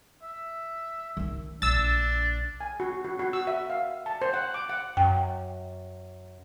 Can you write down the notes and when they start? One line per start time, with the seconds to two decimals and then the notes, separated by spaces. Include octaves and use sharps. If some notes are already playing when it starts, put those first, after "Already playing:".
0.23 E5
1.17 D#3 D#4
1.62 A#1 D4 E6 A6
2.61 G#5
2.80 F#4
3.04 F#4
3.19 F#4
3.33 E6
3.47 E5
3.70 F5
4.06 A5
4.22 C5
4.34 F#5
4.54 D6
4.70 F#5
4.97 F#2 G5